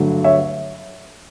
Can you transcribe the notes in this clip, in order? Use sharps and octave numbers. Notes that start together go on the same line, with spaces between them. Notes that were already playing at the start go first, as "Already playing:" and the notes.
Already playing: G2 D3 F#3 A3
C#5 E5